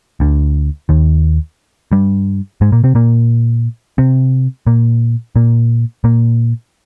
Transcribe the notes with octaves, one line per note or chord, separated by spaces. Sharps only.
D2 D3
D#2 D#3
G2 G3
G#2 G#3
A#2 A#3
C3 C4
A#2 A#3
C3 C4
A#2 A#3
A#2 A#3
A#2 A#3